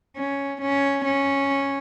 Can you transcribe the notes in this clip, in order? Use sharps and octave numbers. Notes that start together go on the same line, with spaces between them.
C#4
C#4
C#4